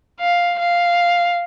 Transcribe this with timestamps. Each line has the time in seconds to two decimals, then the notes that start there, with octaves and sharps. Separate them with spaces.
0.20 F5
0.60 F5